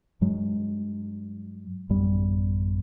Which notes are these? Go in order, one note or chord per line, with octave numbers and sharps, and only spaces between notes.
G2 F#3 G#3
A1 F#2 G3 B3